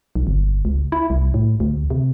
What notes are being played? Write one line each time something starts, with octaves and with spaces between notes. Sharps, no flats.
B1
G1
C#2
E4
C2
A2
D2
C3